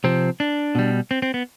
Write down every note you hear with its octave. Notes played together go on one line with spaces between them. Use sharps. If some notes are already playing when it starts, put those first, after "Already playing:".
C3 F3 C4
D4
B2 G3
C4
C4
B3